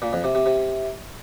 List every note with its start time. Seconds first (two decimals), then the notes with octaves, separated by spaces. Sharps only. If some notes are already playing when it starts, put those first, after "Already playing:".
0.02 A#2
0.13 F2
0.24 C3
0.35 C3
0.46 C3